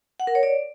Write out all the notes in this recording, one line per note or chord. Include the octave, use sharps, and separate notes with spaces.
F#5
A#4
C#5
D5